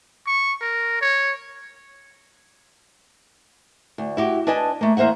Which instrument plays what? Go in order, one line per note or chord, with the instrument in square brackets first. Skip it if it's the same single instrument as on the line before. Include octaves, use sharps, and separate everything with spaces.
[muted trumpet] C#6
A#4
C#5
[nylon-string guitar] D2
E4 F#4 G4
D4 B4 D#5 G#5 A5
A3 A#3
E2 A#3 C5 E5 F#5